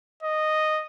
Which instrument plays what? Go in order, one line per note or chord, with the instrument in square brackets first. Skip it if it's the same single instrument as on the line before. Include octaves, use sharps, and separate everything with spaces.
[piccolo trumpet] D#5